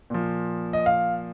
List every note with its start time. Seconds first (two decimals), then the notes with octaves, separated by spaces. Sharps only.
0.10 A#2 F3
0.73 D#5
0.86 F5